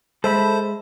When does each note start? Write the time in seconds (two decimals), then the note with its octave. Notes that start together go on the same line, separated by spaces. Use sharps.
0.24 G#3 A4 C5 E5 B5